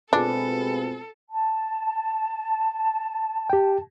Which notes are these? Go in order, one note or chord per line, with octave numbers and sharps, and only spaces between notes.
B2 G#3 C4 D4 F4 G#4 A4 B4
A5
G4 G5